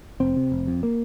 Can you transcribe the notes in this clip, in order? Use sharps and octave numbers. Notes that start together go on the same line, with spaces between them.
F1 C4
C3
F1
F2
A#3